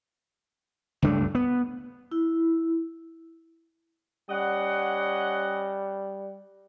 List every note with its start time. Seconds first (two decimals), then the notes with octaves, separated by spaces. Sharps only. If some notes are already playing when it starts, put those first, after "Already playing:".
1.02 C#2 G2 A3 D4
1.35 B3
2.11 E4
4.30 G3 C#4 D#5 F#5